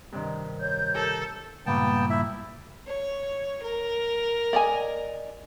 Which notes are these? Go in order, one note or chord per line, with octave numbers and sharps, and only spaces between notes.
G2 C3 D#3
C#5 G6
G4 A4 A#4
C#2 G2 A#2 B3 G5 A5
E4 E5
C#5
A#4
D5 D#5 G#5